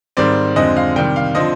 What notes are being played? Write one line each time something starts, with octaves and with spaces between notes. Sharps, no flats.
G#2 D#3 G3 C4 D5
F2 D3 G#3 C4 D#5
F5
C3 D#3 G3 G5
F5
D3 F3 C4 D#5